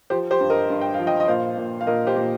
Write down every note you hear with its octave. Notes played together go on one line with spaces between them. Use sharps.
F3 G4 C5
G4 C5
G2
A#4 D#5
G2
G5
F5
F3
D#5 G5
D#5
A#2 C5 F5
A#2
F5
A#2 A#4 D#5
G4 C5
A#2